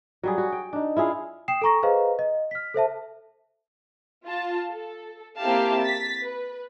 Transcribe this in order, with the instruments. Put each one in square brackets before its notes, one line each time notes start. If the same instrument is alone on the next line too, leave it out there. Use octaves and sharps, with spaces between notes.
[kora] F#3 G3 G#4
F#4
G5
D4 D#4
E4 F4 G#4 F5
[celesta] G5 D#6 C7 E7
A4 G#5 A#5 C#6 A#6
G#4 B4 C5 D#5 F5 A#5
D#5
F6 B6
A4 C5 E5 A5
[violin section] F4 A5
A4
A#3 C4 E4 G4 F5 A5
A6 B6
B4